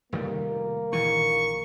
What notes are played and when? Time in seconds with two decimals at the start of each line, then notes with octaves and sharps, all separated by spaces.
0.13 F1 D#3 G3 A#3
0.93 A#1 D#3 E3 C#6